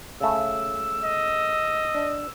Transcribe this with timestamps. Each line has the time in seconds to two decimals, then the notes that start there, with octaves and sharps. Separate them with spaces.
0.20 C#3 A3 E6
1.04 D#5
1.95 D4